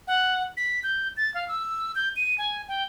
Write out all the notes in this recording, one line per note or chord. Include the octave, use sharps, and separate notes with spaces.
F#5
B6
G6
A6
F5
E6
G6
D#7
G#5
G5